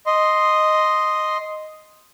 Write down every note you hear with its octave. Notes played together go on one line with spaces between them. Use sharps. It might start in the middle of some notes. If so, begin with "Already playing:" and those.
D#5 C6